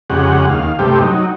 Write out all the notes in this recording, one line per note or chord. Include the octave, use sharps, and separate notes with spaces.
F2 C#3 G#3 G4 F#5
D#2 F5
G2 C3 G3 A3 G4
F#3 D#4